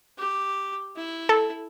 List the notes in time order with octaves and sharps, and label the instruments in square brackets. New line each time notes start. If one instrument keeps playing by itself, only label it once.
[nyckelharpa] G4
E4
[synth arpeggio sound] A4